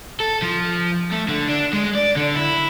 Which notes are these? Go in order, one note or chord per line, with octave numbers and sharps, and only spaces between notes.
A4
F3
A3
D3
D4
G#3
D5
D3
E4